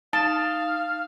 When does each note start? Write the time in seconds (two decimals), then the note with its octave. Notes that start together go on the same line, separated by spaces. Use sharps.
0.13 D#4 F5 A5